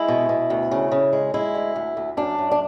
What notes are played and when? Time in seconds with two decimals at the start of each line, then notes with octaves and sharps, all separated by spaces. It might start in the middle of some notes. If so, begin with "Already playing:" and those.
Already playing: G#3 E4
0.08 B2
0.29 B2
0.50 D2
0.71 C#3
0.92 C#3
1.13 G#3
1.34 G#3 E4
1.55 D2
1.76 D2
1.97 D2
2.17 F#2 D4
2.38 F#2
2.51 D4